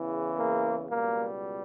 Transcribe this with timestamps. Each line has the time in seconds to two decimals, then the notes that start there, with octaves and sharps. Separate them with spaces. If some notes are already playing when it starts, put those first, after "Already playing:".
Already playing: E2 C#3 E3
0.37 A#3
0.89 C#2 B2 G3 A#3